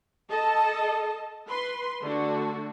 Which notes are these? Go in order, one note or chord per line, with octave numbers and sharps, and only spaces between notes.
A4 D#5 A5
B4 C6
D3 A3 D4 F#4